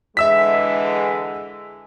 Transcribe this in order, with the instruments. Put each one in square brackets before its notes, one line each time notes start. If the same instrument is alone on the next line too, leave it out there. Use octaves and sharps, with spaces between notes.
[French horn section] D3 E3 G#3 [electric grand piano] E5 E6 B6